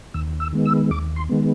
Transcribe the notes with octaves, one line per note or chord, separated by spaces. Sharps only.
D#2 E6
E6
D#3 G#3 B3
E6
D#2 D6
C6
D#3 G#3 B3